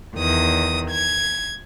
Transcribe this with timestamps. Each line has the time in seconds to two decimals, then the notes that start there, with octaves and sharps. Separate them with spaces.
0.15 E2 D#3 D#6
0.90 G#6